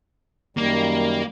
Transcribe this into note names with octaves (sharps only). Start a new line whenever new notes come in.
F#2 D#3 G3 A#3